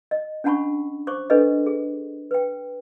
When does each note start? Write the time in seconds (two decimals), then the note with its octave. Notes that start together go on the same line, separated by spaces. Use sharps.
0.11 D#5
0.44 C#4 D4 F#5 A5 B5 C#6
1.07 C5 C#6 D6
1.30 D4 A4 B4 D#5
1.66 G#4
2.31 B4 G5